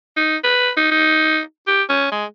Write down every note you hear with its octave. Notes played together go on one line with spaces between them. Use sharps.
D#4
B4
D#4
D#4
G4
C#4
G#3